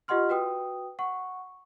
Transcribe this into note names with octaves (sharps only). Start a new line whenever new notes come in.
F4 G4 D#5 F#5 C6 F6
F#4 B4 G5 D#6
F#5 C#6